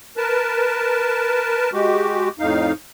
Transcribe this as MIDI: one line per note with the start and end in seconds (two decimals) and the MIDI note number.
0.17 1.70 70
0.17 1.70 71
0.17 1.70 81
1.73 2.29 56
1.73 2.29 66
1.73 2.29 67
2.39 2.73 41
2.39 2.73 45
2.39 2.73 63
2.39 2.73 77